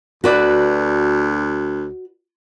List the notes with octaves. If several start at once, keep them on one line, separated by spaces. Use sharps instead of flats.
D2 F#4 B4 D5